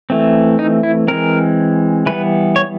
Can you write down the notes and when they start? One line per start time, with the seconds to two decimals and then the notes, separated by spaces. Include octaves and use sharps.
0.10 E3 A3 C4
0.59 D#4
0.83 E4
1.08 E3 G#3 C4 A#4
2.06 E3 G3 B3 B4
2.56 C#5